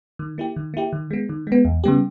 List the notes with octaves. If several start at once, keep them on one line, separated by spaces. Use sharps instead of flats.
D#3
A#3 E4 G4
D#3
A#3 E4 G4
D#3
G#3 B3
D#3
G#3 B3
E2
C#3 G3 B3 G4